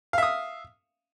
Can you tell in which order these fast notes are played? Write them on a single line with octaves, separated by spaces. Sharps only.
F5 E5 D#6